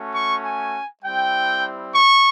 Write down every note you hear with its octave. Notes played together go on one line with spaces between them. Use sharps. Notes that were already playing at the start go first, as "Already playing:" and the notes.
Already playing: A3 C#4 F#4
C#6
G#5
G3 C4 E4 G5
C#6